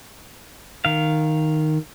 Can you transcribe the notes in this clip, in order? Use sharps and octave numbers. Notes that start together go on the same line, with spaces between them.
D#3 F5